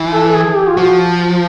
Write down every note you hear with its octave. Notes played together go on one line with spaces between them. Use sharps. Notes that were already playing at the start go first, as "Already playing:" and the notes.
Already playing: E3
A4
A4
G#4
G4
F4
F3 F#4